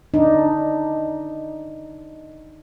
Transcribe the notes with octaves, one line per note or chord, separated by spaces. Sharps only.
D4 D#4